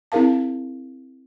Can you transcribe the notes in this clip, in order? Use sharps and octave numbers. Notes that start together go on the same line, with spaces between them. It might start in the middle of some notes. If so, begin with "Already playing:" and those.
C4 E4 G#4 A#4 F5 A5